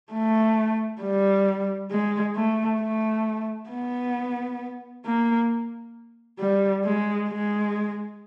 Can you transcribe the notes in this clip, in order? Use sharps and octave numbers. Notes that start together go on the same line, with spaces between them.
A3
G3
G#3
A3
A3
B3
A#3
G3
G#3
G#3